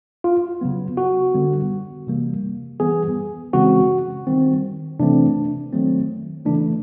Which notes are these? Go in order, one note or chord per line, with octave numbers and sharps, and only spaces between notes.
F4
C#3 F#3 B3
F#4
D3 G3 B3
C3 E3 G3 A#3
E3 G3 B3 G#4
C#3 E3 G#3 C4 F#4
D#3 G3 C4
C3 E3 A3 C4 D4
D#3 F#3 A3 C4
C#3 E3 A3 D4